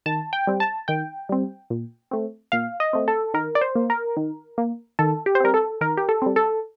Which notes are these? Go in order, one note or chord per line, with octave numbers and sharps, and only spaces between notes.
D#3 A5
G5
G3 C4
A5
D#3 G5
G3 C4
A#2
A3 C4
A#2 F5
D#5
A3 C4
A4
D#3 A#4
D5
C5
A#3
A#4
D#3
A#3
D#3 A4
G4
C5
G3 C4 A#4
A4
D#3 A#4
G4
A4
G3 C4
A4